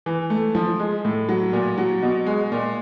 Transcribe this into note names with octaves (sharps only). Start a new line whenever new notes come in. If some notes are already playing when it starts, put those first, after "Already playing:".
E3
A3
F3
G#3
A2
F#3
A#2
F#3
B2
G#3
A#2